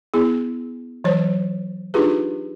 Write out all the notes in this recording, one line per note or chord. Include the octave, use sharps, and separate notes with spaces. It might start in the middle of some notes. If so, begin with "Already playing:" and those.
B3 E4 G#4
E3 F#3 C5 C#5
D4 D#4 F4 G4 G#4 B4